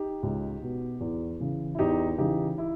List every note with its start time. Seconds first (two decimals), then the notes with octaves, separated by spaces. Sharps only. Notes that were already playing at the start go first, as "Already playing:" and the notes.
Already playing: D#4 G4
0.23 C#2
0.62 B2
1.00 E2
1.40 C#3 E3
1.75 E4
1.79 E2 D#4 G4
2.18 C#3 E3 D#4 G4
2.58 E4